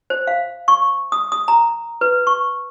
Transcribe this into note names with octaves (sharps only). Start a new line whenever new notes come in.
C5
F5
C#6
D#6
D#6
A#5
B4
C#6